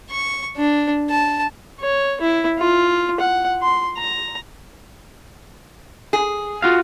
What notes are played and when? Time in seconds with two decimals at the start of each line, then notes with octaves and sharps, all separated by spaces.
0.11 C#6
0.57 D4
1.10 A5
1.80 C#5
2.21 E4
2.58 F4
3.20 F#5
3.62 C6
3.97 A#5
6.13 G#4
6.62 F4 F#4 F5